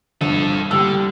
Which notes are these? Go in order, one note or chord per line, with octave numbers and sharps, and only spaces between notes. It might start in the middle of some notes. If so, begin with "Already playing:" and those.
G1 F3 A4 D#7
D3 G3 E6